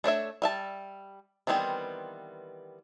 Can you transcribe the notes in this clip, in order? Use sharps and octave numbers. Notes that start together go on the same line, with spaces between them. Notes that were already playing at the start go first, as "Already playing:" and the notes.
A3 D4 C#5 E5
G3 E5 A5
D#3 E3 G3 B3 C4